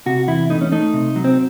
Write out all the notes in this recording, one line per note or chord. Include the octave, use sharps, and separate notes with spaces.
C3 F#4
E2 E4
A3 D#4
C#4
A3 D#4
C3
F#3
C4